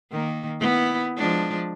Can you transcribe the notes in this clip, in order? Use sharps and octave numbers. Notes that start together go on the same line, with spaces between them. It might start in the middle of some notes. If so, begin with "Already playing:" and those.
D#3 A#3
B3 E4
F3 G#3 D4